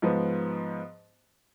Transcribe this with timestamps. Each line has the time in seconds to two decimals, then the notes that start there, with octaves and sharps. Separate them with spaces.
0.02 G#2 F3 B3